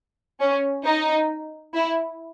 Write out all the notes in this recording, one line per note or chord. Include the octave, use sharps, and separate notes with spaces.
C#4
D#4
E4